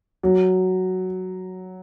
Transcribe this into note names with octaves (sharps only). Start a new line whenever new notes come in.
F#3